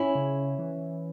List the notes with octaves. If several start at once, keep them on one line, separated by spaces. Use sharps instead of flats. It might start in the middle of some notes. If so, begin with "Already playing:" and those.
Already playing: C#4 E4
C#3
E3